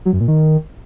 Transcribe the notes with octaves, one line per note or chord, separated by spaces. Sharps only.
F#3
F#2
A#2
D#3